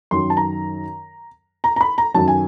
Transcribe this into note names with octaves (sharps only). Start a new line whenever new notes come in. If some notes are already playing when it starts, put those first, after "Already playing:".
F#2 D#3 F#3 C6
A5
A#5
A#5
A#5
B5
A#5
F#2 D#3 F#3 A5
G#5